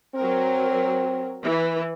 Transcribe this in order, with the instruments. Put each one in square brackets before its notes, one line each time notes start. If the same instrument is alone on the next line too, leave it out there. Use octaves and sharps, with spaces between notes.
[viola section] F#3 A#4 [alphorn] C4
[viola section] E3